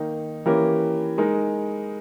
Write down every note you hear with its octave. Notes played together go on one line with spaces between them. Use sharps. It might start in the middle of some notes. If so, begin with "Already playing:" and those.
Already playing: D#3 A#3 D#4
E3 A#3 C#4 G4 A#4
G#3 D#4 A#4